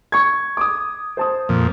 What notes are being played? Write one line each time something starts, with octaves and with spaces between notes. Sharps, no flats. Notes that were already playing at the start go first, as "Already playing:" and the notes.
C#6 G#6
D6 D#6
C5 A5 D#6
F2 A#2